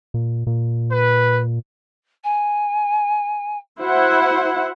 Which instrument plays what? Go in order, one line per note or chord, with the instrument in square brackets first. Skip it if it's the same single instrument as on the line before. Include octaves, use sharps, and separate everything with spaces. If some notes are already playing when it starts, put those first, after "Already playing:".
[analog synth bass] A#2
A#2
[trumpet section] B4
[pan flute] G#5
[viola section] E4 C5 F#5 [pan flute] F#4